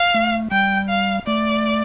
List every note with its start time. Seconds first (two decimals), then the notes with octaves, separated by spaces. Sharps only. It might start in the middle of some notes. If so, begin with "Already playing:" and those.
Already playing: F5
0.14 A3
0.51 G3 G5
0.90 F5
1.27 A3 D5